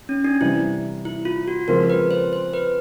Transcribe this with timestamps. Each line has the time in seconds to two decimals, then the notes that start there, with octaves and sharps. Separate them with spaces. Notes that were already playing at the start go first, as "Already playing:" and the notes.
0.09 C#4
0.24 D4
0.41 C3 E3 G3 E4
1.05 E4
1.25 F4
1.48 F#4
1.68 C#3 F3 G#3 C4 F4 A#4
1.90 B4
2.11 C5
2.33 C5
2.53 B4